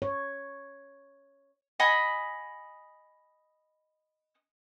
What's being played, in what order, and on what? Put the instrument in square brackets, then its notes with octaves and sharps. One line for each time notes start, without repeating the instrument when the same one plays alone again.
[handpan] C#5
[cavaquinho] D#5 F#5 G#5 B5